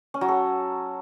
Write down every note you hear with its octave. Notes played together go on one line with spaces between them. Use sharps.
C#4
F#3
A4